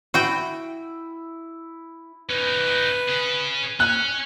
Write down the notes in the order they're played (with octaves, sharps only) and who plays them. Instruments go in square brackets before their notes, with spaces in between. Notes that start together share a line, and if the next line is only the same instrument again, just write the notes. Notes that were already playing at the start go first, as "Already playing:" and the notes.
[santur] E4 [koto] F#4 G5
[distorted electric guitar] C#4 D#4 [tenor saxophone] B4
[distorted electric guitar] C#4 G#4
[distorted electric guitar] C#4 [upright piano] F#6